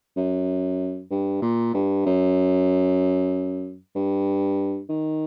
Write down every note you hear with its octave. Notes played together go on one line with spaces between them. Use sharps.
F#2
G2
A#2
G2
F#2
G2
D#3